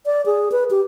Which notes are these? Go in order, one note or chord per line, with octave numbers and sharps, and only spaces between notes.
D5
G#4
B4
G4